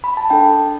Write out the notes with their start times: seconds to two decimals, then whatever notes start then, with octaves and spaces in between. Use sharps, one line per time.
0.04 B5
0.17 A5
0.30 D4 A4 G5